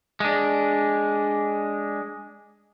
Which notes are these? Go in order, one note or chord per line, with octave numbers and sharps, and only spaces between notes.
G#3 D4